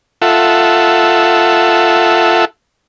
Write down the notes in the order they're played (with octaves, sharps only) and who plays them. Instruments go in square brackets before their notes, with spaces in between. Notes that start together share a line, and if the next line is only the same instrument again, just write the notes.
[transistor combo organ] F4 A4 E5 F#5